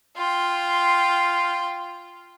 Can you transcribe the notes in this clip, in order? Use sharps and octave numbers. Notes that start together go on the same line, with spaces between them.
F4 G5